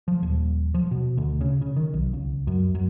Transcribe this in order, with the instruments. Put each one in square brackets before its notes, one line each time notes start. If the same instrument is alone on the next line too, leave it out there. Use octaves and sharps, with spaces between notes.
[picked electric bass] F3
D#1
F3
B2
D2
C#3
C#3
D#3
B1
C#2
F#2
F#2